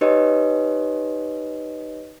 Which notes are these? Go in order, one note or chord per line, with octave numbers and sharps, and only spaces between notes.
D#4 G4 B4 C#5 D#5